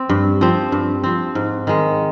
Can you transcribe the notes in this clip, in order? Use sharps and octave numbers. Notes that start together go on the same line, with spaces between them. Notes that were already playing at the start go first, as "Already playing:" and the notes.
Already playing: C4
G2
F3 C4
G2
F3 C4
G#2
D#3 G#3